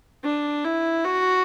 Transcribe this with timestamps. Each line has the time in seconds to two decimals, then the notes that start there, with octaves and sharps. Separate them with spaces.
0.24 D4
0.65 E4
1.05 F#4